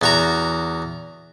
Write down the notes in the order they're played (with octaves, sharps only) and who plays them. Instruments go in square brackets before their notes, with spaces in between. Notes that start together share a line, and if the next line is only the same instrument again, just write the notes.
[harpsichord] E2 F#4 A#5